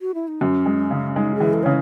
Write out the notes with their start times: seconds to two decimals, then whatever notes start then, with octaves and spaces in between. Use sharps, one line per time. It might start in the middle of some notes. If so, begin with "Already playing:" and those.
0.01 F#4
0.15 E4
0.28 D#4
0.41 F#2 C#4
0.66 G#3
0.91 C#3
1.16 G#3 D#4
1.35 G#4
1.40 E3
1.53 A4
1.63 C#3 C#5